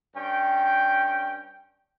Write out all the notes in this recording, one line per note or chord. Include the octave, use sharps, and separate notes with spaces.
G2 C#4 G5